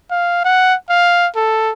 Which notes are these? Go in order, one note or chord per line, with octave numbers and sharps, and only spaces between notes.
F5
F#5
F5
A4